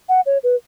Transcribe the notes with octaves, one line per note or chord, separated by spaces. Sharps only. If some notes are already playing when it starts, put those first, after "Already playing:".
F#5
C#5
B4